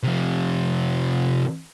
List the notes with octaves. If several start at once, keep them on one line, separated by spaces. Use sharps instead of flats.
C3 F3